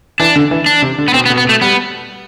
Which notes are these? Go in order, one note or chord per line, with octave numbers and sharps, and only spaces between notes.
E3 D4
D3
E3
D4
C3
D3
B3
B2 C4
B3
B2
B3
B2
A3
G3 B3